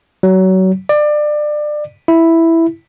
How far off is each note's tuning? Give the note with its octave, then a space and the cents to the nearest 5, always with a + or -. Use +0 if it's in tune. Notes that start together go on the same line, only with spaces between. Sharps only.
F#3 +25
D5 +25
E4 +0